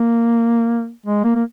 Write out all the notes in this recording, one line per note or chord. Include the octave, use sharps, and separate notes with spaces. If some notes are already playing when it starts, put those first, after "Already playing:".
Already playing: A#3
G#3
A#3
A#3